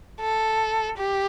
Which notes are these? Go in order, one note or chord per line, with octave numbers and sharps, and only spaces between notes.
A4
G4